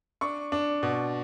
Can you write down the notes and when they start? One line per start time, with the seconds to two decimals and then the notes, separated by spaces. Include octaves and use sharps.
0.21 D4 C#6
0.52 D4
0.83 B2